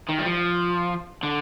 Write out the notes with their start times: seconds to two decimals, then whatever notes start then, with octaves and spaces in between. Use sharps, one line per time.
0.09 D#3
0.19 G3
0.25 F3
1.23 D3